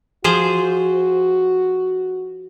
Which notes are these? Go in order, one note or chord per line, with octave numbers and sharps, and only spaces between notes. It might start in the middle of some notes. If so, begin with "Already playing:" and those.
F3 F#4 G#4 C5